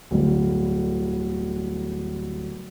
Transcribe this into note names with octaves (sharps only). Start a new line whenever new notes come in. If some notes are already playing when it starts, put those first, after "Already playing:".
D1 G1